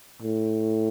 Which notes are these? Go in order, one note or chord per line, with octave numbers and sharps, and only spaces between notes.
A2